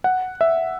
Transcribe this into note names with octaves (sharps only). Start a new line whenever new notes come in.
F#5
E5